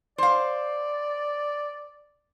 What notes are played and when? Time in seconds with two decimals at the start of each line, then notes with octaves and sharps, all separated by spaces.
0.18 C5 D5 F5